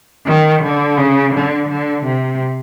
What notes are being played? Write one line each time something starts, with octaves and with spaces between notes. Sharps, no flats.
D#3
D3
C#3
D3
D3
C3